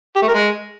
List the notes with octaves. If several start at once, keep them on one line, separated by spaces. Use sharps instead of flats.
G4
A3
A#4
G#3